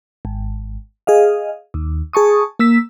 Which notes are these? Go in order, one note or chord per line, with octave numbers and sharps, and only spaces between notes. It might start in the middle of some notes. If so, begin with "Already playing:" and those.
G#1
G#4 D#5 F5
D#2
G#4 A5 C#6 D#6
A#3 E6 B6